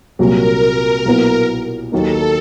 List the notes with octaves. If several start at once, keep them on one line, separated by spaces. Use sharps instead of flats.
C2 A#2 F#3 A#4
B1 A#2 F#3 B3 E4
D#2 D#3 F#3 A#3 D#4 A4